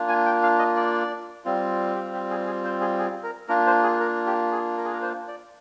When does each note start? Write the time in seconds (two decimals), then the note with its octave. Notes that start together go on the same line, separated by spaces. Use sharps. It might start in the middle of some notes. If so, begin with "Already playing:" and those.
Already playing: A#3 D4 F4
0.08 G#5
0.26 G5
0.43 F5
0.59 D#5
0.76 D5
1.45 G3 C4 F4
1.95 G4
2.13 G4
2.30 G#4
2.46 G#4
2.64 C5
2.81 G#4
2.98 G#4
3.23 A#4
3.48 A#3 D4 F4 A#4
3.67 C5
3.83 G#4
4.00 A#4
4.26 G4
4.51 G#4
4.77 A#4
4.85 G#4
4.93 A#4
5.02 C5
5.28 D5